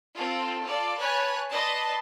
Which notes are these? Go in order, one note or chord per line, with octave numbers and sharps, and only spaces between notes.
C4 F4 A4
F4 A4 D5
B4 C#5 G#5 A5 F#6
B4 D5 D#5 A5 B5 C6